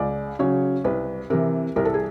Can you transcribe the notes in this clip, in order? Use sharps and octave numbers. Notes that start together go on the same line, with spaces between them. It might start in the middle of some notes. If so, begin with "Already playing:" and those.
Already playing: C#2 D5
C#3 F#3 C#5
C2 B4
C3 E3 A#4
C2 A#4
A4
G#4